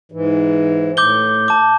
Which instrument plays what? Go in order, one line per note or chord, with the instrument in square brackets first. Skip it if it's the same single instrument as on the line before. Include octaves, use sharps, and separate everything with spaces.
[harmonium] G#2 E3
[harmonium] A2 [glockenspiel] D6 G6 G7
[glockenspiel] A5 D6